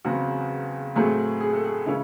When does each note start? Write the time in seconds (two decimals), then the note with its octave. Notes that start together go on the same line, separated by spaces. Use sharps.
0.05 E2 C#3 F#3 C4 F#4
0.95 A2 F#3 A3 C4 G#4
1.40 G#4
1.53 A4
1.65 G#4
1.86 C#3 E3 G#3 C#4 E4